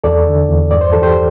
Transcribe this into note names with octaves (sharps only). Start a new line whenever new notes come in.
E2 A4 D5
D3
E2
G2 D5
C5
E3 A4
G4 C5